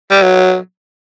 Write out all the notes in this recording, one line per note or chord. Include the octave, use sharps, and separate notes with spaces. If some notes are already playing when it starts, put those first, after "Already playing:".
G3
F#3